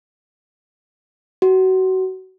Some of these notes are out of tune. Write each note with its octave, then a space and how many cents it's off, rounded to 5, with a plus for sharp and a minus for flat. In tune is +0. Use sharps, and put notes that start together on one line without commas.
F#4 +25